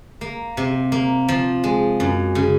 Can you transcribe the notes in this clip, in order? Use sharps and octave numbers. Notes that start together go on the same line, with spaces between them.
A#3
C3
A#3
F3
G#3
F#2
C#3